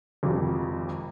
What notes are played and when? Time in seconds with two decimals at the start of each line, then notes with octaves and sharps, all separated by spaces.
0.23 G#1 F2 C3